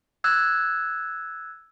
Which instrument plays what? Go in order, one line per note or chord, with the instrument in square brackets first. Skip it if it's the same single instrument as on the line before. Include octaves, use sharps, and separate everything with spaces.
[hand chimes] E6 F#6 G#6